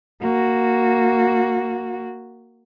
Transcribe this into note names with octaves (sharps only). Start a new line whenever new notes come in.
A#3 F#4